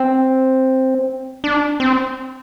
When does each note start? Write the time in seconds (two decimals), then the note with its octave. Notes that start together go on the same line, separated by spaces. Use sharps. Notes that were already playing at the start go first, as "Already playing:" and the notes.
Already playing: C4
1.44 D4
1.80 C4